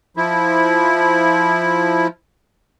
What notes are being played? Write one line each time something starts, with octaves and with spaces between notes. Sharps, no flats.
F3 E4